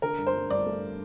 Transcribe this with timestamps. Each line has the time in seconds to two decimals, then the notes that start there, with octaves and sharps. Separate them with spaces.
0.02 D3 A#4
0.18 G2
0.27 C5
0.35 G2
0.50 G2 D5
0.66 A3